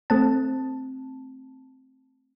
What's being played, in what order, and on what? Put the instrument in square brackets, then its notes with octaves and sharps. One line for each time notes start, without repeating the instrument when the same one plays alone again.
[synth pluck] A3 C4 A5